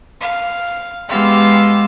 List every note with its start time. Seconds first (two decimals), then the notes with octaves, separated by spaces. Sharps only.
0.20 F5
1.08 G#3 B3 G4 F5 C6 E6